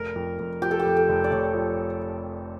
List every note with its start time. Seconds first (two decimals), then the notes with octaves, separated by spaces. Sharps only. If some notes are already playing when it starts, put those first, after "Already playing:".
Already playing: F1 A#4
0.16 F2
0.39 F2
0.62 F3 G4
0.71 A4
0.80 G4
0.85 F2
0.97 A4
1.09 F1
1.24 D5
1.31 F1 C#5
1.54 F3